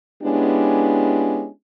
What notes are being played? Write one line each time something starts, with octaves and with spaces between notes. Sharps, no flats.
G#3 B3 C#4 D4 E4 G4